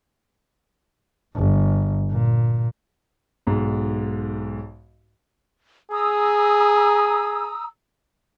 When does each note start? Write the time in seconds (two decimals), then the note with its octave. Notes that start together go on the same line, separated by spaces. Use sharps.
1.36 G1
2.11 A#2
3.47 B1 G#2
5.91 G#4 A#5 D#6 E6